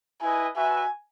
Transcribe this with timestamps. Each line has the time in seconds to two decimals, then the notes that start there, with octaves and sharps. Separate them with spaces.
0.21 E4 B4 D#5 G#5
0.56 F#4 B4 E5 G#5